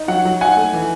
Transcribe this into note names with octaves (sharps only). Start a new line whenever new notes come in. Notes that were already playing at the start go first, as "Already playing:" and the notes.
Already playing: D#4
F#3 F#5
F#3
D#4 F#5 G#5
A3
E3